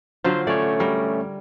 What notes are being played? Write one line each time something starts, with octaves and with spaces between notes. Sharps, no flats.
D3 F#3 F4 C5
A3 C#4 C#5 D5
G3 A#4